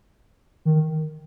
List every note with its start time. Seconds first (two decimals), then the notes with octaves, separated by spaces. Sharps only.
0.65 D#3